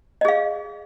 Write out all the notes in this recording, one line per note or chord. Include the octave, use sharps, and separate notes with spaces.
G#4 D#5 F5